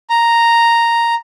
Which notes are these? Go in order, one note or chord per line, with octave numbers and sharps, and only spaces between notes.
A#5